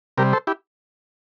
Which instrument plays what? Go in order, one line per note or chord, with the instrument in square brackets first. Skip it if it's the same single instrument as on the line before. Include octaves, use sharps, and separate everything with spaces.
[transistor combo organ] C3 G3 G4 A#4
A4 C5
E4 G4